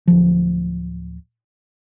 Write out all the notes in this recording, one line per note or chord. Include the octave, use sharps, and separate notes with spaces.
D1 F3